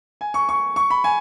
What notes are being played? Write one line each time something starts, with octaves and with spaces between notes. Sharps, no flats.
G#5
C#6
C#6
C#6
B5
G#5